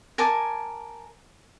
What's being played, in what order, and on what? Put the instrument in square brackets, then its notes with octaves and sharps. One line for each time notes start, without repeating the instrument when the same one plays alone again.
[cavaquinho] A#4 G#5 A5 D6